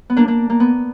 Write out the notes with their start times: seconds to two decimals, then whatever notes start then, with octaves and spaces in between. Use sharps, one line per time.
0.10 B3
0.17 A#3 D4
0.28 A#3 D4
0.50 A#3
0.60 B3